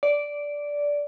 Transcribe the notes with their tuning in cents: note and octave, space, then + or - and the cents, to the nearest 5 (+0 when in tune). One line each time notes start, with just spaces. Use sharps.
D5 -10